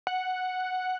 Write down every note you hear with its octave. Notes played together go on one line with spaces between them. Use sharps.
F#5